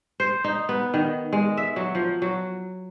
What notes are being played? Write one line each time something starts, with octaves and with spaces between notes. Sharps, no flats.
C5
D#4
B3
D#3
G#3
E5
F#3
F3
F#3